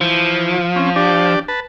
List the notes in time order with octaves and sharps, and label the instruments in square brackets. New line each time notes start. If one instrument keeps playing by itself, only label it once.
[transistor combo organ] E3 [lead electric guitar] F3
[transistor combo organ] C4 C#4
D4 G4 D5
B4 A5